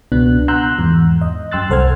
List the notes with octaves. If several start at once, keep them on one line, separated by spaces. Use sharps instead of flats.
C#2 B2 B3 D4 F#6
F#5 A#5 C6 E6 F#6 G6
E2 G#2
D#5
F#2 G5 C6 E6 F#6 A6
C2 A4 C5 F#5 F6 G#6